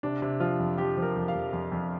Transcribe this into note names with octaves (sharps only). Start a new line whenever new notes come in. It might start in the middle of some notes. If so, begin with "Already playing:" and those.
C3 D4
C3
F3 F4
F2
F3 G4
F3
A#4
F2
F5
F2
F2
F2